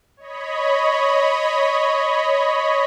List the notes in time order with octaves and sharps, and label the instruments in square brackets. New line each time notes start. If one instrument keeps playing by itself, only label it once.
[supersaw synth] C#5 D#5 B5